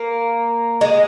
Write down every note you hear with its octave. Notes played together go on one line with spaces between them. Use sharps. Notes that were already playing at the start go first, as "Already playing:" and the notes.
Already playing: A#3
G#3